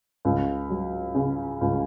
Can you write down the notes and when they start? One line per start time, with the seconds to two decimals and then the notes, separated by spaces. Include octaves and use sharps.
0.25 C#2
0.70 F#3
1.15 C#3
1.61 C#2